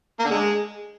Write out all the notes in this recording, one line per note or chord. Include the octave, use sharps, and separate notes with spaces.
A#3
D3
G#3